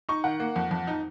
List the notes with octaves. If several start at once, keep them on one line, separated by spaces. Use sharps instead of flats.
D#4 C#6
D#3 F#5
A#3
F2
F2
D#4